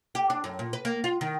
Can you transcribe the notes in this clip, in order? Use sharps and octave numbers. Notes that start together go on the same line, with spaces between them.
G4
D4
F#2
A#2
B4
A#3
F4
D#3